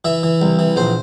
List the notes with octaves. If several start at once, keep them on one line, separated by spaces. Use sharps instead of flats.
E3 E5
E3
C2
E3
A#1 C5